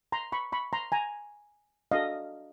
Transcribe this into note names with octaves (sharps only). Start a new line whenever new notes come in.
A#5 C6
B5 C#6
B5 C#6
A#5 C6
G#5 A#5
D4 F#4 A4 D#5 F5